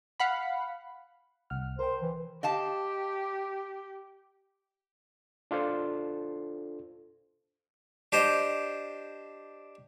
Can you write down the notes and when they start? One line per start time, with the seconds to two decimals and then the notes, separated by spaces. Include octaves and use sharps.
0.20 F5 F#5 B5
1.50 C2 F#5 F6
1.79 A#4 C5 G5
2.02 E3
2.43 G4 D#5 F5 A5
5.51 D4 F4 A4 C5
8.12 D4 G4 C5 D#5